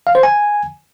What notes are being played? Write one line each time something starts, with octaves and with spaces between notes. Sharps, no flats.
F5
C5
G#5